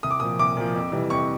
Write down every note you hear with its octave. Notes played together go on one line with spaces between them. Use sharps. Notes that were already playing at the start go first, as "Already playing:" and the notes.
C2 D#6
D6
A#2 F3 D#6
C2 D6
A#2 F3
F2
C3 E3 G3
F2 C#6